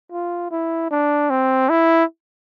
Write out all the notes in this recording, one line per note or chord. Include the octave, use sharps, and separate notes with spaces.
F4
E4
D4
C4
E4